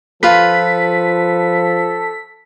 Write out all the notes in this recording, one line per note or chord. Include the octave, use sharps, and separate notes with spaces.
F3 F4 A4 B4 B6